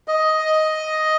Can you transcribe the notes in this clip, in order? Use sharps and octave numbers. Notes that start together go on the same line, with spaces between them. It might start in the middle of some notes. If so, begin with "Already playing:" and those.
D#5